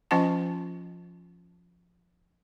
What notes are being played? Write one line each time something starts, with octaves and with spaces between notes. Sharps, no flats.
F3 C#4 F4 D#5 F#5 A5